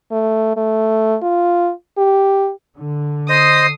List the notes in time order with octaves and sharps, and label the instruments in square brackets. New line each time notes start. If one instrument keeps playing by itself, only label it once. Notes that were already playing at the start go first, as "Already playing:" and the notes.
[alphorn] A3
A3
F4
G4
[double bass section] D3
[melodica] C5 D#5 [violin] D#6 C7